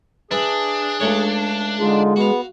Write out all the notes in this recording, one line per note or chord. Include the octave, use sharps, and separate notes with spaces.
D4 G#4 B4 E5
C#2 A3 C#5
D3 G#3 D#4 F4
B3 F#4 F5